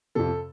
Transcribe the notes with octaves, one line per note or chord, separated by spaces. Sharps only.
F2 C3 A4